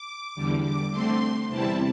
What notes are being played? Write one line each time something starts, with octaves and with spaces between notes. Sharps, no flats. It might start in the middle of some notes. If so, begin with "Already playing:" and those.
Already playing: D6
E2 D3 G3
D6
D3 A3 C4 C6
E2 C3 G3 C4 E4 A5